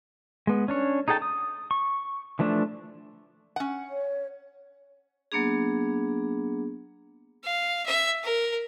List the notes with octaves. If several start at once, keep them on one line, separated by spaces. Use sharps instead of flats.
G#3 B3
C#4 D4 C#5
D#4 G#4 A4 G5 A5
D#6
C#6
E3 F3 A3 D4
C#4 F#5
C#5
F#3 A#3 B3 D4 G#4
F5
E5
A#4